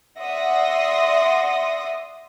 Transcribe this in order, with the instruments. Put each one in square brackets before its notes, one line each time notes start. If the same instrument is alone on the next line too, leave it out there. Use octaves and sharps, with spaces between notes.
[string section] D5 E5 F#5 C6 D#6 A#6